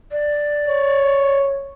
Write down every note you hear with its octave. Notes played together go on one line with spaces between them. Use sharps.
D5
C#5